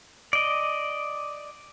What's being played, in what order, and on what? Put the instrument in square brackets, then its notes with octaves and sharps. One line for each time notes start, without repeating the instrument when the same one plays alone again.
[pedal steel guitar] D5 D#5